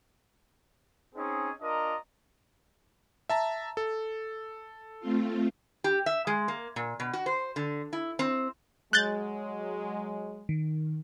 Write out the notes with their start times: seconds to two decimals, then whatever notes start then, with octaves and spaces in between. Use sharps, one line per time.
1.15 C4 C#4 D#4 G#4
1.61 D4 F4 A#4 D#5 A#5
3.29 E5 A5 A#5
3.77 A4
5.00 A3 C4 F4
5.84 G4
6.06 E5
6.27 G#3
6.48 A#3
6.76 A#2
7.00 B2
7.13 F#4
7.26 C5
7.56 D3
7.93 E4
8.19 C4
8.93 F#3 G#3 F#6 G6 A6
10.49 D#3